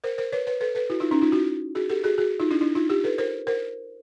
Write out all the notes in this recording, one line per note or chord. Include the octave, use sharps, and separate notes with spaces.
A#4 C5
A#4 C5
B4 C#5
B4 C#5
A4 B4
A4 B4
E4 F#4
D#4 F4
C#4 D#4
D#4 F4
E4 F#4
F#4 G#4
G4 A4
F#4 G#4
F#4 G#4
D#4 F4
D4 E4
D4 E4
D#4 F4
F4 G4
A4 B4
A#4 C5
A#4 C5